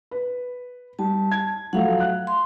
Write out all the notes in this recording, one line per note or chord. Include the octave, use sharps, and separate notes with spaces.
B4
G3 A5
G#6
F3 F#3 A3 F5 F#5
F#6
C6